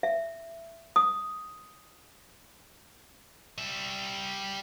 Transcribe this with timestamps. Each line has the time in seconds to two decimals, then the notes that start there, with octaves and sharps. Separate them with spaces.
0.03 E5
0.96 D#6
3.58 G3 E5